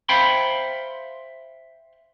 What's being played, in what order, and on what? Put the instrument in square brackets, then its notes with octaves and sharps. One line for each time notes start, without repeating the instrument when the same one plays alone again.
[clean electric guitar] C5 E5 F5 G5 B5 C6